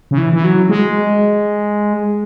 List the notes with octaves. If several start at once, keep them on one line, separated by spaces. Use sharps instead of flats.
C#3
E3
E3
F#3
G#3